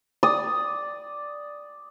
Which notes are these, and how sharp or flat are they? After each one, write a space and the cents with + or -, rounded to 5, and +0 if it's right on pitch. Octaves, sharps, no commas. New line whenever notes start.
D5 +0 D#6 +0